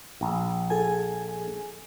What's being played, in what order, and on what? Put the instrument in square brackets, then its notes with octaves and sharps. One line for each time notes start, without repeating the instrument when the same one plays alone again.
[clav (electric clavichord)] A#1
[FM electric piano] G#4 A4 G#5